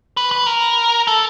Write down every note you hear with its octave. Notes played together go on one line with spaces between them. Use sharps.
B4
B4
A#4
A4